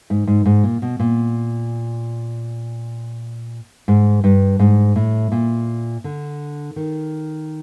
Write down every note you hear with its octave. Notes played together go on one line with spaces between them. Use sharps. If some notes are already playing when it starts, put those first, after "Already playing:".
G#2
G#2
G#2
A#2
B2
A#2
G#2
G2
G#2
A2
A#2
D3
D#3